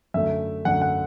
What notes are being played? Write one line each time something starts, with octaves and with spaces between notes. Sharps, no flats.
F#2 D3 A3 E5
F#2 D3 A3 F#5
F#5